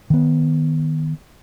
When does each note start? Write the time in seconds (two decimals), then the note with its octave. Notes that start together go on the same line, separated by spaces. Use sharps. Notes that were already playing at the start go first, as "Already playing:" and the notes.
0.10 D#3 B3